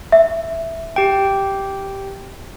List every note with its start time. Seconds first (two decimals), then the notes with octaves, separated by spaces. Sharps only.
0.12 E5
0.96 G4 G5